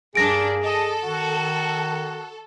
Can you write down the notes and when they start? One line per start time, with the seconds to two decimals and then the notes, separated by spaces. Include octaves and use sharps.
0.15 G2 A#3 D4 G#4 A#6 D7
0.64 A4 D#5
1.04 D#3 F#4